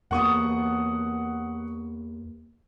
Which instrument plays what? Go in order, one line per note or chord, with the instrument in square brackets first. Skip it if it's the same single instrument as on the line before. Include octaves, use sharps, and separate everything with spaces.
[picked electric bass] E2 A#3 B3 [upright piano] F#5 C#6 D#6